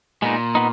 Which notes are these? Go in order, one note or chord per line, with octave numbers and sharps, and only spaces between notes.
A#2 G#3 B3 D#4
B3 D#4